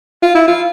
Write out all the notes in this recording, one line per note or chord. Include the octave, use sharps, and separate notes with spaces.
F4
E4
F4